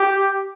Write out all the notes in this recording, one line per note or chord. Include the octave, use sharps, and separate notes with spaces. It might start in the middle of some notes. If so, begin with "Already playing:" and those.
Already playing: G4